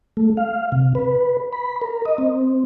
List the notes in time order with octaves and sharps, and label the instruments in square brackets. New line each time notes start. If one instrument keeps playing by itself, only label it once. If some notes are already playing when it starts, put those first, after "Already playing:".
[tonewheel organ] A3
F5
C3
B4
B5
A#4
D#5
C4